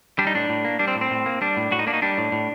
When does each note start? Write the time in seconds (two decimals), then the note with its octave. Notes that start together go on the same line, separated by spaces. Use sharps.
0.19 G3 D4
0.27 D#4
0.35 A2 D4
0.49 A2
0.65 A#3
0.79 G3 D4
0.88 C4
0.95 A2
1.01 C4
1.11 A2
1.26 A#3
1.41 G3 D4
1.57 A2
1.71 A2 F#4
1.79 D#4
1.87 A#3 D4
1.94 D#4
2.02 G3 D4
2.18 A2
2.32 A2